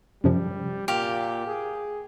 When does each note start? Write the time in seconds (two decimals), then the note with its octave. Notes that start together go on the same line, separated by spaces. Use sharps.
0.24 F#2 C3 F3 G3
0.88 A#2 G4 F5
1.47 G#4